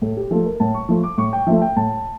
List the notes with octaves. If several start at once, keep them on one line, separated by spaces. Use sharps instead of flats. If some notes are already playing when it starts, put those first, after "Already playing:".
A2 A4
G4
F3 A3 A4
A#4
A2 A5
C#6
F3 A3
D6
A2 C#6
G5
F3 A3 E5
G5
A2 A5